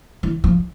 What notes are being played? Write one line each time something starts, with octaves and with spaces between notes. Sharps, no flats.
E3
F3